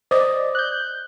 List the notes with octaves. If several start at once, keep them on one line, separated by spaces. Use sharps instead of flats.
C5 D5 D#5
F#6 G6